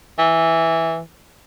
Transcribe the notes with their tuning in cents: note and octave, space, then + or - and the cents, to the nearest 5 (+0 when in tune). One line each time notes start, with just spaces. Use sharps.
E3 -5